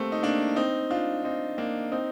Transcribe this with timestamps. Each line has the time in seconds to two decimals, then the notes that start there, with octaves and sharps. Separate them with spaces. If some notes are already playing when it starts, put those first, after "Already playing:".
Already playing: G3 A3 A#3 C4
0.12 D#4
0.23 A#3 D4
0.56 C4 D#4
0.90 D4 F4
1.24 C4 D#4
1.58 A#3 D4
1.92 C4 D#4